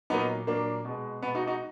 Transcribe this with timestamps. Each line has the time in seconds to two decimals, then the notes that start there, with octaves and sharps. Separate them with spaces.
0.10 A#2 F#3 A#3 B3 D#4
0.47 A#2 F#3 A#3 D4
0.85 B2 G#3
1.22 B2 G#3 B3
1.35 D#4 F#4
1.47 D#4 F#4